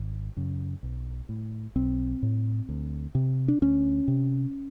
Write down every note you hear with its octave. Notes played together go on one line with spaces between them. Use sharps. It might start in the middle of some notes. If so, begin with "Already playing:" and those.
Already playing: G#1
F#2 C#3
B1
A2
B1 C4
A2
D2
C3
D4
D2 C#4
C3